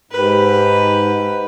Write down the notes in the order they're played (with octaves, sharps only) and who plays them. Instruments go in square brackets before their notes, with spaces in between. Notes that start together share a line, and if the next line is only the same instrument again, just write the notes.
[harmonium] G#2 [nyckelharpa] G4 B4